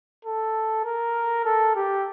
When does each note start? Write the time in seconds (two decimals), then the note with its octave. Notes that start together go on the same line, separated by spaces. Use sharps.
0.25 A4
0.85 A#4
1.45 A4
1.75 G4